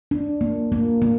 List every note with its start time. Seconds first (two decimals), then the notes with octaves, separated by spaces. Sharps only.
0.11 D4
0.41 A#3
0.72 A#3
1.02 A#3